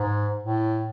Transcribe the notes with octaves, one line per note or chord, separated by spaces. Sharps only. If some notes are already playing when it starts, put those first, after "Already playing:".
Already playing: G#2
A2